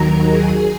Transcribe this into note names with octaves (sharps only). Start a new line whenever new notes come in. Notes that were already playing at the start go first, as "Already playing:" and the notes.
Already playing: D#2 D#3 F#3 A#4 A#5
G#4 G#5